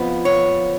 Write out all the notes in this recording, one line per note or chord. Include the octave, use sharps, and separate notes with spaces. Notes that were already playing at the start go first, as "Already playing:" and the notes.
Already playing: F2 F3 B3
C#5